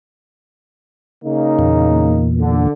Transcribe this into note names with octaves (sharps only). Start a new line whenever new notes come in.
C#3 A#3 D#4
E2 A#2
D3